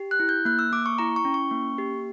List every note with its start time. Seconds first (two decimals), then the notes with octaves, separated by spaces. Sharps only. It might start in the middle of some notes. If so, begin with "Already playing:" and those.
Already playing: G4
0.11 F#6
0.20 E4
0.29 G6
0.45 A#3 F#6
0.59 E6
0.72 A#3 D6
0.86 C#6
0.99 E4 A#5
1.16 C#6
1.25 C#4
1.34 C#6
1.51 A#3
1.78 G4